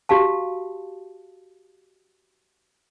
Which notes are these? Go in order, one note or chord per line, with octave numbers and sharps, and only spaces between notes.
F#4 G4 F5 A5